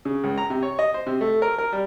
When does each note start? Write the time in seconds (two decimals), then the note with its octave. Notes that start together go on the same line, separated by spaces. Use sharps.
0.05 C#3
0.24 C#2
0.38 A#5
0.50 C3
0.63 C#5
0.79 D#5
0.94 C5
1.06 C3
1.21 A3
1.42 A#4
1.58 A#4
1.72 G3